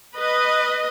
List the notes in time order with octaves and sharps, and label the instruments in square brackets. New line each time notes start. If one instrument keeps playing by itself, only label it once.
[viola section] B4 D#5